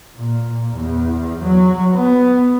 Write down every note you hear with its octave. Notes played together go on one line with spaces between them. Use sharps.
A#2
E2
F#3
B3